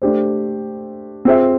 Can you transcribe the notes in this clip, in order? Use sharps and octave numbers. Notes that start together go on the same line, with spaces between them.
A3 D4 G4 C5
C4 F4 G#4 C5 E5